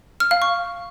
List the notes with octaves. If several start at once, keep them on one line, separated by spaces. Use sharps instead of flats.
F6
F5
C#6